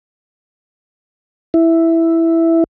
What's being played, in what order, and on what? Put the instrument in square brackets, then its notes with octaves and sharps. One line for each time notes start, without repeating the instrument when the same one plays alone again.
[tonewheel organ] E4